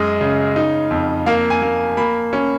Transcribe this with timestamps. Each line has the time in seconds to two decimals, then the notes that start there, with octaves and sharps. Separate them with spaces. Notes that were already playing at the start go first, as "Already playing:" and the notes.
Already playing: F#2 G#3 D#5
0.21 C#3
0.56 D#4
0.91 F2
1.26 A#3 F5
1.50 G#5
1.62 A#3
1.97 A#3 B5
2.33 C#4